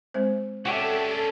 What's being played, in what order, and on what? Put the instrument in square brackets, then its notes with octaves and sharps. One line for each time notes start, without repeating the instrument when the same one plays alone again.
[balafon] G#3 C4 C5
[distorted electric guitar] C#4 D4 [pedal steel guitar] F#4 G4 E5 [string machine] A4